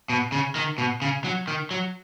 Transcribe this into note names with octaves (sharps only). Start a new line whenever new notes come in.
B2
C#3
D#3
B2
C#3
F#3
D#3
F#3